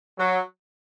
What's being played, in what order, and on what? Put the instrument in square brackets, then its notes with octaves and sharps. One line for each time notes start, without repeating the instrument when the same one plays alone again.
[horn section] F#3